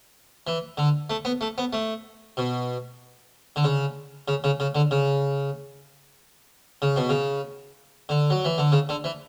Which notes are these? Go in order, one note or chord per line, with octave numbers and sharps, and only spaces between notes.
E3
D3
A3
B3
A3
B3
A3
B2
D3
C#3
C#3
C#3
C#3
D3
C#3
C#3
B2
C#3
D3
F#3
E3
D3
C#3
D3
E3